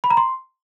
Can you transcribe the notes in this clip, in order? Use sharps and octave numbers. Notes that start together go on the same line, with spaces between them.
B5
A#5
C6